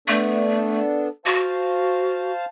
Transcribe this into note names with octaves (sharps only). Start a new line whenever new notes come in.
A3 B3 D4 A4
F#4 C5 F5 A5